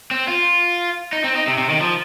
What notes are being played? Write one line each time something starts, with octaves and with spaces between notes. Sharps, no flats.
C4
F4
D#4
C4
D#4
C3
C3
D#3
F3